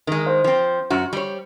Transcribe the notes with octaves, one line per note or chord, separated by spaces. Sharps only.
D#3 G#3 A#4
C5
F3 C4
F#2 F#4
G3 C#5